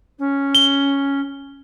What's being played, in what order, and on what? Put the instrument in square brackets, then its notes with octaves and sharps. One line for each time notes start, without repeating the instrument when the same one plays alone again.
[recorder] C#4
[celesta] G7